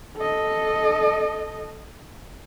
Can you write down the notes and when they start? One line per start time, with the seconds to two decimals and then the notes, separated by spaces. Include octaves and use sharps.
0.17 A4 D#5